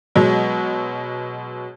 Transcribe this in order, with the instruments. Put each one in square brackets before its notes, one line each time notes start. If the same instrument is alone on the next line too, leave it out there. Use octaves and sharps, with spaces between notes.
[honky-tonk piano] B2 F#3 G#3